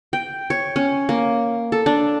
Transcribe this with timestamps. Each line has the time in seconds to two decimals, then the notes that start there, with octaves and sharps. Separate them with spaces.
0.13 G5
0.50 C#5
0.76 C#4
1.09 A#3
1.72 A4
1.86 D4